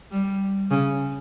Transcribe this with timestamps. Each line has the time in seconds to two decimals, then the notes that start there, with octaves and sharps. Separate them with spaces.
0.11 G3
0.71 C#3